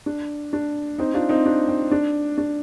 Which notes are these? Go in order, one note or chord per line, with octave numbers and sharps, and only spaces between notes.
D4
D4
C4 D#4
D4 F4
C4 D#4
D4
C4
D4
D4